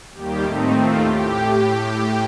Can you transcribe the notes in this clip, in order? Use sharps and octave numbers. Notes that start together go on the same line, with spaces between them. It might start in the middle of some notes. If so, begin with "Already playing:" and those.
D#2 D#3 G3 A#3 G4
A2 A3 C4 D#4
D#2 D#3 A3 C4 F4
A2 G4